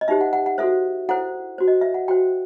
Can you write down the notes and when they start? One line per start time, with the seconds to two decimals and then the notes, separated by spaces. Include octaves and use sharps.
0.01 D#5
0.08 D#4 G4 C5 E5
0.21 F#5
0.33 F#5
0.46 F#5
0.58 F#4 A4 C5 E5
1.09 E4 A4 C5 F#5
1.58 F#4 C5
1.68 D#5
1.81 E5
1.94 F#5
2.08 F#4 C5 G5